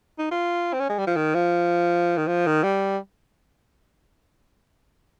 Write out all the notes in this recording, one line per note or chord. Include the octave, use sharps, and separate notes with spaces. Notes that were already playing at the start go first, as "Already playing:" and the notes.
D#4
F4
C4
C#4
G#3
G3
F3
D#3
F3
D#3
F3
D#3
G3